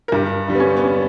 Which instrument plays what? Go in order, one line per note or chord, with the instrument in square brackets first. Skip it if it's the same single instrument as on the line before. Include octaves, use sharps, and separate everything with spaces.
[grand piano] A#4
[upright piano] G2 [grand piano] G4
[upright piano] D3 G3
[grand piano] B3
C#4
B3
C#4